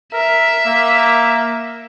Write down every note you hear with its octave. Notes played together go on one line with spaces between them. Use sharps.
A#4 E5
A#3